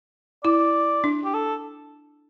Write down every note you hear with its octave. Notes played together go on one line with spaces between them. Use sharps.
E4 D5
D4
G4
A4